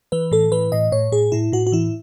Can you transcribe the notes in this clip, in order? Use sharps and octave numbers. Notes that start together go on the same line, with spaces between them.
E3 B4
A2 A4
E3 B4
A2 D#5
A2 C#5
A2 G#4
A2 E4
A2 F#4
F#4
E3 E4